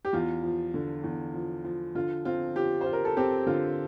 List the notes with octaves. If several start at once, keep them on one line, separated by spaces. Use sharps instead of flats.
G4
E2 F4
F3
D3
E2
F3
F3
D3 F4
C4 F4
F3 G4
F4 C5
A#4
A4
C4 G4
D3 F4